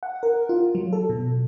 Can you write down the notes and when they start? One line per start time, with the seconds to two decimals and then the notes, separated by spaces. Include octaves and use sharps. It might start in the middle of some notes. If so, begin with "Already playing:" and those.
0.03 F#5
0.23 A#4
0.49 F4
0.75 F#3
0.93 A4
1.10 B2